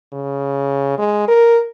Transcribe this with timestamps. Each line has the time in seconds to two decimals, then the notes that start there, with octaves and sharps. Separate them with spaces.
0.13 C#3
0.99 G#3
1.28 A#4